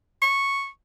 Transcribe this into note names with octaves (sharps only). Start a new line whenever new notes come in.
C#6